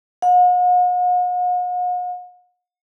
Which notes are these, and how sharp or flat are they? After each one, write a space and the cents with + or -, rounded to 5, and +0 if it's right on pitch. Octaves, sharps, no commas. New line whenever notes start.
F#5 -45